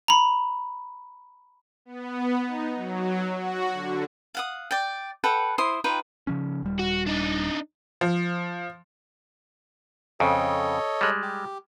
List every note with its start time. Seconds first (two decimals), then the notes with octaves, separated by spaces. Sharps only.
0.08 A#5 B5
1.85 B3
2.46 D#4
2.76 F#3
3.33 F#4
3.73 D3
4.35 F5 F#5 D#6
4.71 D5 G5
5.24 A4 B4 F#5 G5
5.58 E4 C5 C6 D#6
5.84 D#4 F4 B4 G5
6.27 C#3 F3 C#4
6.63 D#1 G3
6.79 F#4
7.06 D4 D#4
8.01 F3
10.20 F2 C#3 A4 C#5 D#5
11.01 G3 G#3
11.22 G4